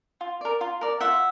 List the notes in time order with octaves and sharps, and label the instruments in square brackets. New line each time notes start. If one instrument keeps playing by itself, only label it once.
[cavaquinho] F4
A#4 D5
F4
A#4 D5
F4 E5 F#5